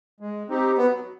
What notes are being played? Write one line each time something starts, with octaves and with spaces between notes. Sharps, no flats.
G#3
C4 D#4 G4
F#3 B3